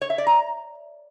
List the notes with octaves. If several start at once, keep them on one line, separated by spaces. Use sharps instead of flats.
C#5
E5
D5
A#5